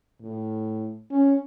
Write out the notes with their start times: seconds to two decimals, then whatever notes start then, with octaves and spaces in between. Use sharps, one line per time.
0.21 A2
1.11 C#4